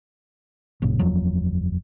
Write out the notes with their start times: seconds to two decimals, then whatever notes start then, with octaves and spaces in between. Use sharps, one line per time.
0.82 G#1 F#2 A#2 C#3
0.99 F#1 E2 F3 F#3